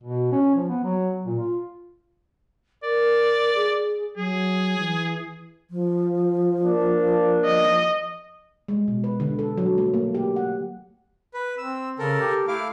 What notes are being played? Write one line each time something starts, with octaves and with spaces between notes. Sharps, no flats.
B2
C#4
F3
B3
F#3
A#2
F4
A#4 D5
G#4
F#3 G#4
E3
F3
A#3 D4
D#5
G#3
B2
B4
D3
A4
F#3
A3
A#3
G4
F#5
B4
C4 E6
C#3 A4 A#4
G4
A3 E4 F5 D6